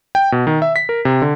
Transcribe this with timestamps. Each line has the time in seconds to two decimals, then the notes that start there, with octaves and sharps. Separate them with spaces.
0.15 G5
0.32 B2
0.47 D#3
0.62 E5
0.76 B6
0.89 A#4
1.05 C3
1.22 D3